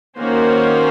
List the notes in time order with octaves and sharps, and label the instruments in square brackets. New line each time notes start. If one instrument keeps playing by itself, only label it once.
[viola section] D#3 A#3 C#4 F#4 C5